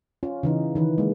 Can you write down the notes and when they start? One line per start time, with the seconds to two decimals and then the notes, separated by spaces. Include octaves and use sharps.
0.23 C#4 F4
0.43 C#3 E3 D#4
0.75 D#3 E3 B4
0.98 G#3 A#3